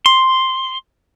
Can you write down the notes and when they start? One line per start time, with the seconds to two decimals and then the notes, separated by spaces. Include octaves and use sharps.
0.06 C6